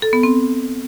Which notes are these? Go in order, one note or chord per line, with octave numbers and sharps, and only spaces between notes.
A4
B3
C4